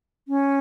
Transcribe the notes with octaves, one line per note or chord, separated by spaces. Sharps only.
C#4